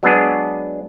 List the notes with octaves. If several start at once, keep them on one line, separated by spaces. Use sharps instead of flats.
F#3 G#3 B3 D4 G#4